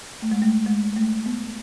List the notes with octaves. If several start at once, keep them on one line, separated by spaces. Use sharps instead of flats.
A3
G#3
A3
G#3
A3
B3